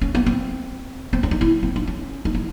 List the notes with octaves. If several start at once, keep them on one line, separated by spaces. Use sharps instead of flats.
C#4
B3
C4
C4
C#4
D#4
E4
C4
D4
C#4
D#4
E4